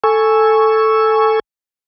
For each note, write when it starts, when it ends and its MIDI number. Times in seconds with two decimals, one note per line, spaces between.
0.04 1.40 69
0.04 1.40 80
0.04 1.40 85
0.04 1.40 88